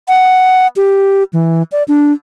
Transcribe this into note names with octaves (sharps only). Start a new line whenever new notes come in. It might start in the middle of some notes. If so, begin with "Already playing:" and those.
F#5
G4
E3
D5
D4